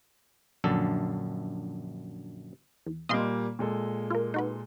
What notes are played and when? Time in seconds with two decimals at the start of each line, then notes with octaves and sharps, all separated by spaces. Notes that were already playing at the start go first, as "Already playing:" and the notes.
0.64 A#1 F#2 D3 A4
2.87 E2
3.09 A#2 G3 A#3 D#5 F5 C6
3.59 A#2 G#3 A4
4.10 F4 A#4
4.34 D#4 F#4 B4